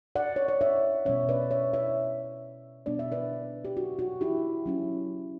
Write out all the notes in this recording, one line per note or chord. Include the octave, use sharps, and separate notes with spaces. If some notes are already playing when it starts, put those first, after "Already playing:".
D5 F#5
C#5
D5
C#5 E5
B2 G3 C#4 C#5 E5
B4 D5
C#5 E5
C#5 E5
B2 G3 B3 D4 D5
E5
B4 D5
G4
F#4
F#4
E4 G4
F#3 C#4 E4